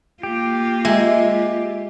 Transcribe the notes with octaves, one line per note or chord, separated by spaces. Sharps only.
A#3 F4 G4
G#3 E5